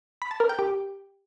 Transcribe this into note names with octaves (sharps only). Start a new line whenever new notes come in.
B5
A5
A#4
G5
G4